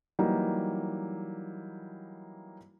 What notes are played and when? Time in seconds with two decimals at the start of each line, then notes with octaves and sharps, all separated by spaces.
0.19 E3 F#3 G3 A#3 D#4